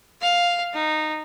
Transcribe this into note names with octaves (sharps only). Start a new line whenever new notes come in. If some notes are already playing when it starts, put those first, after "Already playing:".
F5
D#4